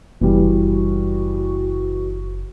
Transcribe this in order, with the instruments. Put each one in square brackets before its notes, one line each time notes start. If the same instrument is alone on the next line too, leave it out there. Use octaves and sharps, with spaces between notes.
[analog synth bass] F#1 [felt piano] E3 G3 [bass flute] F#4